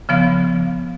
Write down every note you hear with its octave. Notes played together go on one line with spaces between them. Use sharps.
C#3 F3 B3 F5